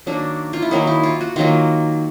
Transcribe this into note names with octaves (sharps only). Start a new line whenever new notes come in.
D#3 F#3 A#3 D4
F4
E4
D#3 F#3 A#3 D#4
E4
F4
F#4
D#3 F#3 A#3 F4